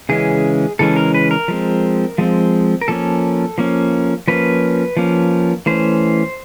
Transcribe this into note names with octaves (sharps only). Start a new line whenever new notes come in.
C#3 E3 G#3 C#4 G#4
C#3 E3 G#3 C#4 A4
A#4
B4
A#4
F3 G#3 C4
F3 G#3 C4
A#4
F3 A#3 C#4 A4
F3 A#3 C#4
F3 A#3 C#4 B4
F3 A#3 C#4
E3 A3 C#4 C5